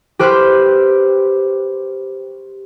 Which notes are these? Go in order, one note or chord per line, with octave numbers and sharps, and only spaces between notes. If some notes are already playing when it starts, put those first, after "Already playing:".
G4 B4 C5 C6 F6 F#6